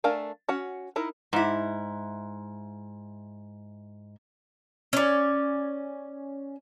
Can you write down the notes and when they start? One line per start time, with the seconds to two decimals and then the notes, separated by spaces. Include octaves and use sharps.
0.04 A3 D4 A#4 F5 G#5
0.49 C#4 F#4 F#5
0.96 D#4 E4 A#4
1.33 G#2 E4
4.93 C#4 D5